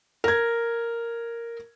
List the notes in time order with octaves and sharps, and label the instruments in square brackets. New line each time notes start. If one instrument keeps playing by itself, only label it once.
[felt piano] A#4 G#6